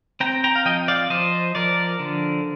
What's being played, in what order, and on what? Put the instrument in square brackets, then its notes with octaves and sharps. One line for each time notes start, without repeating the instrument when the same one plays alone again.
[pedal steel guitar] C4 G5 A#5
G5 A#5
F5
F3 D#5 G5
D5 F5
F3 C5 D#5
F3 A#4 D5
D3